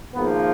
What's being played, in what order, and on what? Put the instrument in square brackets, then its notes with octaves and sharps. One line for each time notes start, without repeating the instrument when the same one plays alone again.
[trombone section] G#1 G#2 F3 A#3 B3